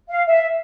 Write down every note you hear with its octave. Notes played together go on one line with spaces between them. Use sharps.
F5
E5